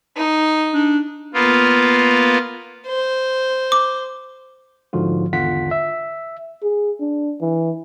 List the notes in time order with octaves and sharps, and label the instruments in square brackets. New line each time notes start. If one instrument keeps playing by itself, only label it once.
[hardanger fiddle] D#4
[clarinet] D4
[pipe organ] A#3 B3 F4
[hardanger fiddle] C5
[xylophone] D6
[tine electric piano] G#2 D3 F3 F4 F#4
G#1 E2 D3 F4 F#5 B6
E5
[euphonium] G#4
D4
E3